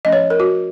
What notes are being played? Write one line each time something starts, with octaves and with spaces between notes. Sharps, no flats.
F3 A3 C#4 D#5
C#5
A#4
F#4